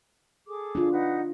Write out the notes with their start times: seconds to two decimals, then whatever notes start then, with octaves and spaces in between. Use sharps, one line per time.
0.47 G#4 A4 D6
0.75 D4 F4
0.93 D#4 B4 F#5